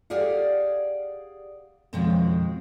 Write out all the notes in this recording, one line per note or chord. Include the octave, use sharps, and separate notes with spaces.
G4 G#4 D5 F5 F#5
F2 B2 D#3 F3 G#3 C4